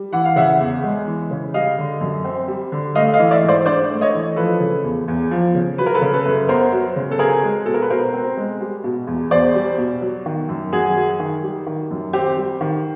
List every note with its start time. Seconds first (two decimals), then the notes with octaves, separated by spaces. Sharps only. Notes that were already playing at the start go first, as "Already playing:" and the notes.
Already playing: G3
0.13 E3 F#5
0.25 F5
0.36 C#3 E5 F#5
0.60 E2
0.84 G#3
1.07 E3
1.31 C#3
1.54 G3 D#5 F5
1.78 D3
2.01 F#2
2.25 C4
2.48 G3
2.72 D3
2.95 A3 D#5 F5
3.14 D#5 F5
3.19 E3
3.31 D5 E5
3.43 G#2
3.48 C5 D5
3.66 D4 C5 D5
3.89 A3
4.01 C#5 D#5
4.14 E3
4.36 F3 A4 B4
4.60 C#3
4.84 E2
5.08 E2
5.31 F3
5.55 C#3
5.78 F#3 B4
5.86 A#4
5.95 A4 B4
6.01 C#3
6.13 A4 B4
6.26 F#2
6.49 B3 A#4 C5
6.72 F#3
6.96 C#3
7.11 A4
7.19 C4 G#4 A#4
7.43 G#3
7.66 B2 A4
7.74 A#4
7.82 B4
7.90 B2 A#4 C5
8.14 C4
8.37 G#3
8.61 G3
8.84 B2
9.07 E2
9.31 E2 C5 D5
9.55 G3
9.78 B2
10.02 F#3
10.26 D#3
10.49 F#2
10.72 F#2 F#4 G#4
10.96 F#3
11.20 D#3
11.43 G3
11.66 D#3
11.91 F#2
12.13 C4 G4
12.37 G3
12.61 D#3